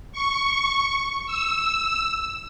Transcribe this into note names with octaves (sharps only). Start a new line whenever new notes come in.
C#6
E6